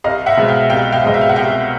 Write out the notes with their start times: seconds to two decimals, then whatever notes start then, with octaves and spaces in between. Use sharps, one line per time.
0.04 C2 D#5 F5
0.26 E5 F#5
0.37 B2 G#3 C4
0.48 F5 G5
0.70 C2 F5 G5
0.92 F5 G5
1.03 B2 G#3 C4 D#5
1.14 E5
1.21 F5
1.29 F#5
1.36 C2 F5 G5